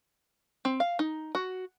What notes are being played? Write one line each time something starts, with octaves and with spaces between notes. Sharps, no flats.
C4
F5
D#4
F#4